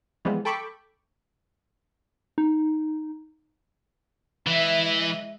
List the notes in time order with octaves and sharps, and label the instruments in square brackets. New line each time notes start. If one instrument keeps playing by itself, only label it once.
[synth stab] E3 F3 G3 G#3 B3
A4 G5 B5 C#6 D6
[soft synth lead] D#4
[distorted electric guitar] E3 [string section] G#3 D#5 E5